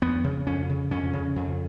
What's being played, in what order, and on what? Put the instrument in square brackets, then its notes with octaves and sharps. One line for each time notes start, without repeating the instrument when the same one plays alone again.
[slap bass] F2 B3
C#3
F2 C#4
C#3
F2 C#4
C#3
F2